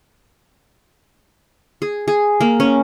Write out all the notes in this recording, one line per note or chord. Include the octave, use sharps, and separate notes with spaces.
G#4
G#4
A#3
C#4